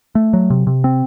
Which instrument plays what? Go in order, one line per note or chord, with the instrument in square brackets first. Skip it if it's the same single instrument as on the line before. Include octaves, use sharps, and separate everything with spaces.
[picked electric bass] A3
F#3
C3
C3
C4